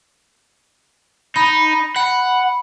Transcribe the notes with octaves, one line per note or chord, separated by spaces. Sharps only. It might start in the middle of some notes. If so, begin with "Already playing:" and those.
D#4 B5
F#5 B5